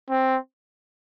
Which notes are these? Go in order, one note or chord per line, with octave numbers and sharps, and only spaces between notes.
C4